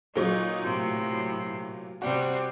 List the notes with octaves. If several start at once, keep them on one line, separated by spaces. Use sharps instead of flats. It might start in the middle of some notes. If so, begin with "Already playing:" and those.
A#2 F#3 D#4 C#6
A2 C3
C3 G3 C4 F#4